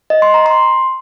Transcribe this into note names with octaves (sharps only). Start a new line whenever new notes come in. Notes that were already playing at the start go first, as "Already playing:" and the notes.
D#5
C6
A#5
C6